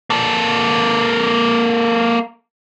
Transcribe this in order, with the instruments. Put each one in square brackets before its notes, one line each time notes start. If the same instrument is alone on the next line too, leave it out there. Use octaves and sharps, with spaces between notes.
[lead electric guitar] A#3 A4